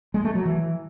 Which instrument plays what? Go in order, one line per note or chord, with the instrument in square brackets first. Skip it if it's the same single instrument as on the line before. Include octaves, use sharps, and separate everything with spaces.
[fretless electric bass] G#3
A3
F#3
E3